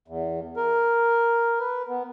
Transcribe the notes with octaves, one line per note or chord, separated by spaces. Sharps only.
E2
A#4
B4
B3